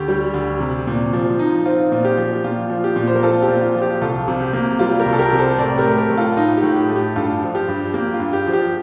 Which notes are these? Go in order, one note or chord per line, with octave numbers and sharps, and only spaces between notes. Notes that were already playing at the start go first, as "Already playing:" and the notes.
Already playing: D2 G4
G3
D2
C3
A#2
F3
D#4
C4 F4
A#2
G4
F3
A#2 F4
F3
G4
A#2
C5
A#4
C4 F4 A4
G4
A#2
F4
F3
G4
C2 F4 A4
C3
G4
A#3
G3 F4
G4 A#4
C2
A4
G4 A#4
C3
A4 C5
A2 A#4 D5
G4 A#4
A3
G4 A#4
A2
F4 A4
D#4 F4
G4
A2
G4
A3
G4
G2 F4 A4
F3
G4
G2
A#3 G4
F4
G2
G4
F3
G4